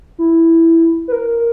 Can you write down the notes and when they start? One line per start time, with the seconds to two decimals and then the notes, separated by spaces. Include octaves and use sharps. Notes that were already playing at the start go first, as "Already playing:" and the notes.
0.18 E4
1.08 B4
1.12 A#4